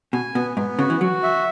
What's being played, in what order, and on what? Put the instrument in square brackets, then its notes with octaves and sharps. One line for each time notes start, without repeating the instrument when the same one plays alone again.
[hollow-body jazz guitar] B2 [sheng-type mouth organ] G#5
[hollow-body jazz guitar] B2 [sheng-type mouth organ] B3
[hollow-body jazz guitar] G#2 [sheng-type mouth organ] B3
[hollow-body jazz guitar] C#3 [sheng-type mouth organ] F#4
[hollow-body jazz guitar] E3
[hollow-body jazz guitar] F#3 [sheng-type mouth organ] F#4
[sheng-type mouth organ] E5